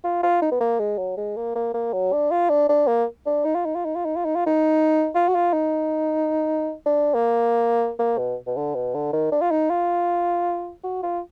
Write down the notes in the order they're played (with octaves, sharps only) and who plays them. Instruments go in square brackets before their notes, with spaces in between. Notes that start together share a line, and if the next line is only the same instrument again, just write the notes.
[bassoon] F4
F4
D#4
B3
A#3
G#3
F#3
G#3
A#3
A#3
A#3
F#3
D4
F4
D4
D4
A#3
D4
D#4
F4
D#4
F4
D#4
F4
D#4
F4
D#4
F4
D#4
F4
F#4
F4
D#4
D4
A#3
A#3
B2
B2
D3
B2
D3
D#3
D4
F4
D#4
F4
F#4
F4